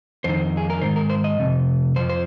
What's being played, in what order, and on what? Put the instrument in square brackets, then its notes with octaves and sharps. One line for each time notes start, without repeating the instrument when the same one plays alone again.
[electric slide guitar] F2 D#3 C5
G#4
A#4
G#2 D#3 C5
A#4
C5
D#5
F2 C3
F2 C5
F3
C5